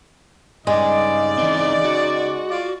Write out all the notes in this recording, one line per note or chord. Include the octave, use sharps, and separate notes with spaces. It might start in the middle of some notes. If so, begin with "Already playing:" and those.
G2 C#3 G#3 D#4 D5
E3 C4
F#4
F4 D5